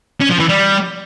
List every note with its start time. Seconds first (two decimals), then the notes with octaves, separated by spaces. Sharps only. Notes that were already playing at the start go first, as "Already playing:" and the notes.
0.21 C#4
0.30 F3
0.40 E3
0.49 G3